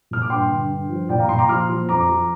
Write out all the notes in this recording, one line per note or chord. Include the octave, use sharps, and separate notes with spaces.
A#2 F6
D6
G2 G5 C6
D3
G2
F3
A#2 D5 G5
F5 A#5
A#2 G5 C6
A#5 D6
F3 C6 F6
F3
F2 A#5 D6
F3